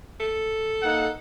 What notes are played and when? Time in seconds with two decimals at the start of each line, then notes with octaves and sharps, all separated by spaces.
0.20 A4
0.82 A#3 D#4 F#5